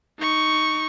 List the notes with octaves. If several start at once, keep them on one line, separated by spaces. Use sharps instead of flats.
D#4 C#6